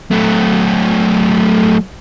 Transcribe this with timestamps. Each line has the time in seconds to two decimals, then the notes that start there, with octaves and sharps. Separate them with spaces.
0.11 F#3 A3